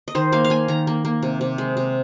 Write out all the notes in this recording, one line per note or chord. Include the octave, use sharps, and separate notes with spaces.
D#5
D#3 C5
A#3 F5
F5
A#3 G#5
D#3 A#5
A#3
A#3
C3
C3
G#3
C3